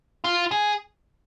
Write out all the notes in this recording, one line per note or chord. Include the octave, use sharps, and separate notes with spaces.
F4
G#4